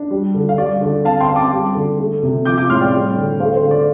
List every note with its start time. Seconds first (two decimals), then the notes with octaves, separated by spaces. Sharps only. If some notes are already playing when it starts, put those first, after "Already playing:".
Already playing: D4
0.11 G3
0.34 D3
0.49 F5
0.58 G3 D5
0.81 D3
1.05 C4 F5 A5
1.20 G5 C6
1.28 C4
1.36 A5 D6
1.52 G3
1.75 D3
1.99 A3
2.23 C3
2.45 F3 D6 G6
2.57 D6 G6
2.70 A2 C6 F6
2.81 D5 G5
2.92 G3
3.17 D3
3.40 A3 C5 F5
3.56 C5
3.63 D3
3.71 D5